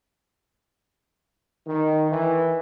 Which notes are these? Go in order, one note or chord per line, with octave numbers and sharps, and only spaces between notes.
D#3
E3